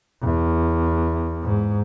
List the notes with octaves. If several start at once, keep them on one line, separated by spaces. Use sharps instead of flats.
E2
G#2